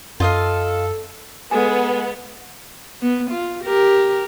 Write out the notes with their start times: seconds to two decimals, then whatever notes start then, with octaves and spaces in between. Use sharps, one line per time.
0.20 F#2 F4 A4 D#5 F5
1.51 G#3 B3 A4 G#5
3.02 B3
3.31 F4
3.65 G4 A#4